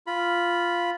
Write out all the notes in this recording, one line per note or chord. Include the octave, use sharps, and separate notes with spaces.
F4 B5